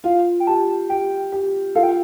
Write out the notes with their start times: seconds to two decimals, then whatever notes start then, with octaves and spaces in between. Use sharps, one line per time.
0.04 F4 F5
0.40 G5
0.47 G4 A5
0.89 G4 G5
1.32 G4
1.75 F4 A4 F5
1.83 G5